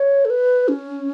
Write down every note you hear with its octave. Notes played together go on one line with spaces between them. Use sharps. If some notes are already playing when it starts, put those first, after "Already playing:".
Already playing: C#5
A4
B4
C#4